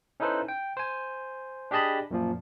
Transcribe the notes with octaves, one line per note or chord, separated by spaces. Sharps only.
C#4 D#4 E4 A4 B4 C5
G5
C5 G#5
D4 G4 G#4 D#5 A5 B5
F#2 A#2 F3